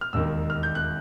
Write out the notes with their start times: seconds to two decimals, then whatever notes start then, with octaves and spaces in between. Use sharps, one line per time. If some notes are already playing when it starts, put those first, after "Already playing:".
0.01 F6
0.13 E1 D#2 D#3 E6
0.50 F6
0.63 G6
0.75 F#6